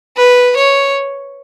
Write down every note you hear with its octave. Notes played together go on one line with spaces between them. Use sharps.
B4
C#5